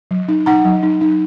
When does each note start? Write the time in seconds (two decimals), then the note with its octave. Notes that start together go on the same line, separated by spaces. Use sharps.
0.11 F#3
0.28 D#4
0.46 D#4 F#5 A#5
0.65 F#3
0.83 D#4
1.01 D#4